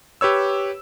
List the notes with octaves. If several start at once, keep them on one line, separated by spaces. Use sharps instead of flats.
G4 B4 C#5 E6